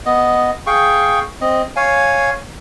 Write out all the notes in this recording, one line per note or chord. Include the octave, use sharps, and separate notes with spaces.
B3 D#5
G#4 F5 G5 C#6
C4 D#5
C#5 F5 G#5